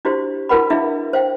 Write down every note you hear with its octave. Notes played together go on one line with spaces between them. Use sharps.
D4 E4 F#4 G4 C5
E4 F#4 A#4 B4 F#5 B5
D4 E4 G#4 E5 F5
C5 F5 G5